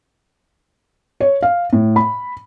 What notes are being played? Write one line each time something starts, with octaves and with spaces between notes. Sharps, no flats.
C#5
F5
A2
B5